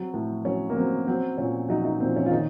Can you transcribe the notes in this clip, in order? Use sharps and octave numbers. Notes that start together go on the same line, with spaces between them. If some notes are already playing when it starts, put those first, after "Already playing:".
Already playing: F#3 C4
A2
F#3 C#4
A#3
F#3 C4
F#3 C4
A#2 C#4
F#3 D#4
D#4
A#2 C4
C#4
F4
D#3 D#4